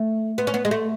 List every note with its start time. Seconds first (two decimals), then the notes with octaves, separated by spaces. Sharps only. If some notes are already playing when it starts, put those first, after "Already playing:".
Already playing: A3
0.38 B3
0.47 C#4
0.54 B3
0.65 G#3
0.71 A3